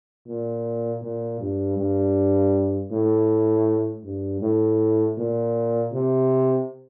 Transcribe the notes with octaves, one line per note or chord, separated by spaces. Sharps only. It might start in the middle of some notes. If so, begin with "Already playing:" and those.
A#2
A#2
G2
G2
A2
G2
A2
A#2
C3